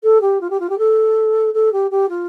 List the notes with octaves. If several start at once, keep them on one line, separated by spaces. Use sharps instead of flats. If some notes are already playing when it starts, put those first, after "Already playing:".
A4
G4
F4
G4
F4
G4
A4
A4
G4
G4
F4